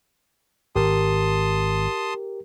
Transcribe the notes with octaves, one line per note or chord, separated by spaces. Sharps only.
G#1 G4 A#4 A5 C6 D#6